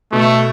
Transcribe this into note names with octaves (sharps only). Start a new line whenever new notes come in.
B2 A3